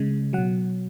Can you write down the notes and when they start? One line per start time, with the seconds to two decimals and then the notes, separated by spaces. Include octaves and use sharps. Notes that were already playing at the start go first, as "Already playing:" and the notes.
Already playing: C#3 G#3
0.33 F#3 F#5
0.38 B2